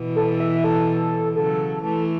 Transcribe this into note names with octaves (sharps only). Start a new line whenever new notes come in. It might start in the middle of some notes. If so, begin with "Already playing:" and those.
Already playing: B2 E3
A4
E5
A4
C#3 F#3 A4
E3 A3 A4